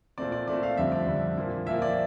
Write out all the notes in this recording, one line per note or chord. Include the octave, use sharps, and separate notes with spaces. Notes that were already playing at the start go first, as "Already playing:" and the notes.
A#2 A3 C4 D5
D5
A#2 A3 C4 D5
F5
F2 D3 G3 C4 E5
D5
F2 D3 G3 C4
A#2 F3 A#3
A#2 F3 A#3 E5
D5